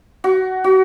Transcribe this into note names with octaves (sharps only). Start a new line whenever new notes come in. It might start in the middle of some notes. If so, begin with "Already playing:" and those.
F#4
F#4